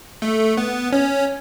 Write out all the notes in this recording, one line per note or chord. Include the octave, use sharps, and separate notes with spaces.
A3
B3
C#4